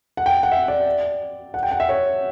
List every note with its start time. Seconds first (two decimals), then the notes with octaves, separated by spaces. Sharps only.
0.17 F#5
0.26 G5
0.43 F#5
0.52 E5
0.68 D5
1.54 F#5
1.63 G5
1.72 F#5
1.80 E5
1.89 C#5